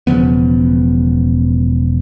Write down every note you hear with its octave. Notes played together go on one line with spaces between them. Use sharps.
E1 C#3 F3 B3